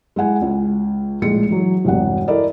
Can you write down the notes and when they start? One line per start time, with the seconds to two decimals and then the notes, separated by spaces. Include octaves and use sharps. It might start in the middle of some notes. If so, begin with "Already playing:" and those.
0.16 G#3 E4 F#5 G#5
0.42 C#2
1.22 A#1 A2 G#3 C#7
1.49 E3 F#3
1.85 E1 C2 G2 F#5
2.28 E4 A4 A#4 D5 D#5